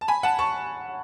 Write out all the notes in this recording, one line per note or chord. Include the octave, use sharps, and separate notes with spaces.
A5
G#5 B5
F#5 A5
A5 C#6